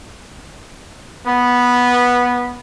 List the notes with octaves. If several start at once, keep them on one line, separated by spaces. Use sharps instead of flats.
B3